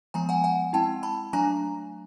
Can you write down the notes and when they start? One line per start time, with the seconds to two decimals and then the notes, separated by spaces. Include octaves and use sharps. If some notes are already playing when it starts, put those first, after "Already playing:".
0.14 F3 G#3 B3 G#5 A#5
0.29 F#5 G#5
0.44 F#5 G#5
0.73 G#3 C4 E4 G5 A5
1.03 A5 B5
1.33 F#3 A3 D4 G#5 A#5